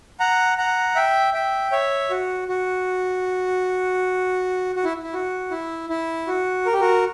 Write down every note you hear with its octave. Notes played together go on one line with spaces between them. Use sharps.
F#5 A#5
F#5 A#5
E5 G5
E5 G5
C#5 E5
F#4
F#4
F#4
E4
E4
F#4
E4
E4
F#4
A#4
G4
F#4 A#4